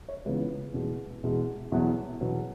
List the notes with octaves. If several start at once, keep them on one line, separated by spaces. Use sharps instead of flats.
C#5
C#2 C#3 E3 B3 B4
E2 B2 G#3
E2 B2 G#3
E2 B2 F#3 B3
E2 B2 F#3 B3 B4